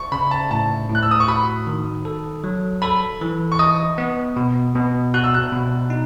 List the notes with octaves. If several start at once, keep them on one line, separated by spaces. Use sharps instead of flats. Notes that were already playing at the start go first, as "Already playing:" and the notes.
Already playing: C#6
C#3 B5
A5
A2 A5
A2
F#6
E6
D#6
C#6
F#4 B5
D#3
A4
F#3
A4 B5
E3
C#6
D#5 D#6
B3
B2
B2
F#4 F#6
E6
F#6
B2
D#4